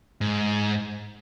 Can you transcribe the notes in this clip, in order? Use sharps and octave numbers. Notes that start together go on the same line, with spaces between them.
G#2